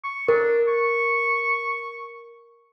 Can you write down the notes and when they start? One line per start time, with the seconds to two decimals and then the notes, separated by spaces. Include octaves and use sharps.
0.04 C#6
0.28 D4 A#4
0.68 C#6